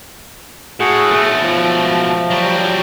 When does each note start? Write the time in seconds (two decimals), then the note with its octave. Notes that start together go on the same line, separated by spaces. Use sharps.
0.80 A2 F#4 G#4 F#5
1.11 B2 A3
1.42 F3
2.30 F#3 G3